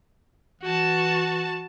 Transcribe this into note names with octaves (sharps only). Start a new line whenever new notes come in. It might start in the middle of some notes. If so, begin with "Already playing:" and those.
E3 F#4 A5